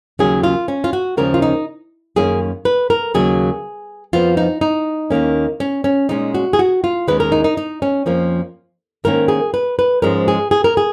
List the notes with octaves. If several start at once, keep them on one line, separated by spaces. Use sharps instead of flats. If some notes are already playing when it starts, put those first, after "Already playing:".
D#2 C#3 F#3 A#3 C#4 G#4
F4
C#4
F4
F#4
D#2 C#3 F3 G#3 C#4 A#4
F4
D#4
F#2 D#3 A#3 C#4 G#4
B4
A#4
D#2 C#3 F#3 A#3 G#4
F2 F3 B3 F4
D#4
D#4
D#2 D#3 A#3 C#4
C#4
C#4
A#2 G#3 C#4 D#4
F#4
G#4
F#4
F4
D#2 D#3 G#3 C#4 B4
A#4
D#4
D#4
D#4
C#4
F2 F3 A#3 C#4
G#2 D#3 A#3 C#4 A#4
G#4
B4
B4
G#2 F3 G#3 C#4 A#4
G#4
G#4
A#4
G#4